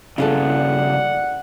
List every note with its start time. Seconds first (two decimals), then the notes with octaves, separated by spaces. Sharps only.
0.18 G2 C#3 A3 E4 G#4 A4 D5 F#5